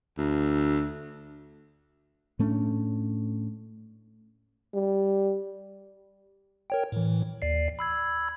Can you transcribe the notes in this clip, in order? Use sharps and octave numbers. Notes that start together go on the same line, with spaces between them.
D2
A2 A3 C#4 D4
G3
A#4 C#5 G5
A2 E3
D#2 D5 C7
B5 E6 G#6